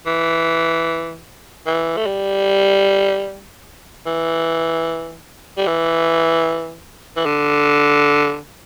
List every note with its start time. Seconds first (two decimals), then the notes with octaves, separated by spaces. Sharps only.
0.06 E3
1.66 E3
1.97 A3
2.06 G3
4.06 E3
5.58 G3
5.66 E3
7.16 E3
7.26 D3